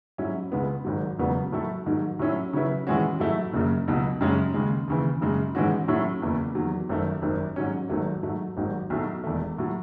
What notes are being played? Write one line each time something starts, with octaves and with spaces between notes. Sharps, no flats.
G#2 F#3 C#4 E4
C#2 C#3 G#3 B3
G#1 G#2 F#3
E1 E2 C#3 F#3 B3
A2 F#3 A3 E4 A4
G#2 D#3 F#3
A2 F#3 C#4 E4
C#3 F#3 C#4 E4 B4
A2 E3 G#3 C#4 F#4
G#2 F#3 A3 E4
F#1 F#2 C#3
C#2 B2 F#3
F#2 C#3 G#3 C#4
D#2 C#3 G#3
D#2 C#3 E3
F#2 C#3 G#3
G#2 E3 G#3 C#4 F#4
A2 F#3 C#4 E4
F#1 E2 C#3 E3
E2 D#3 F#3
G#1 F#2 D#3 A3
G#1 F#2 D#3
G#2 F#3 C#4
G#1 G#2 D#3 F#3 A3
G#2 F#3 A3
G#1 G#2 F#3
B1 A2 F#3 A3
E1 E2 D#3 A3
A2 F#3